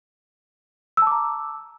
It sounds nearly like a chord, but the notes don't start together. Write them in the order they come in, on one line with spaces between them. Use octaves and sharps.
E6 A5 D6 A#5